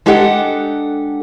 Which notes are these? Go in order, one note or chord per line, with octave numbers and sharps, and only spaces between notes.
G#3 D4 G4 A4 F#5 G5